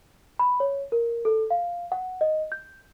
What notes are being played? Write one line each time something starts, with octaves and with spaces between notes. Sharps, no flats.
B5
C#5
A#4
A4
F5
F#5
D#5
G6